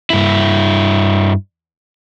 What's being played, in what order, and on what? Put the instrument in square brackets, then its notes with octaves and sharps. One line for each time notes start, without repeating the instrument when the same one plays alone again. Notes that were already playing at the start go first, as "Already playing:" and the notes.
[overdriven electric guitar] G2 E4